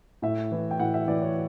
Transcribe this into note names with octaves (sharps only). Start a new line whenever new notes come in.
A2 E5
E3
G5
A2 F#5
E5
E3 D5
C#5